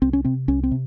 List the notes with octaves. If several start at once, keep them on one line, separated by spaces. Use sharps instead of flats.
C2 C4
C#4
C3 C4
C2 C#4
C4
C3